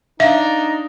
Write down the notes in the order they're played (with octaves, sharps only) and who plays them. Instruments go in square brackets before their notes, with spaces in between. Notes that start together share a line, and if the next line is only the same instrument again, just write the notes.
[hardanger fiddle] D4 [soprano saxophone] D#4 [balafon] E5 [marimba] F5